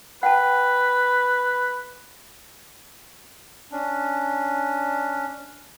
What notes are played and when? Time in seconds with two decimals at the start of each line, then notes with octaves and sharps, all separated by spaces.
0.23 B4 F#5 G5 A5
3.72 C#4 D4